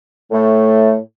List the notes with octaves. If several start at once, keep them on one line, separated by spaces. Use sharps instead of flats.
A2 A3